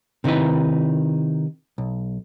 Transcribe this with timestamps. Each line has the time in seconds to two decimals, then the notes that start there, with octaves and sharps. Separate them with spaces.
0.24 C3 D#3 D#4 E4 B4
1.78 B1